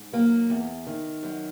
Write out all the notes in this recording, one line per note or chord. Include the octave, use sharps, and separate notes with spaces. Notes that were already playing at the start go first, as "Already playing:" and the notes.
Already playing: G#2
F#3 A#3
E2
D#3
F#2